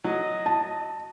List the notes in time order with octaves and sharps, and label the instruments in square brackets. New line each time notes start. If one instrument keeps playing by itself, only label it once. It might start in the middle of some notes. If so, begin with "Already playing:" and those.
[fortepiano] F#3 [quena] D#5
[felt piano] A5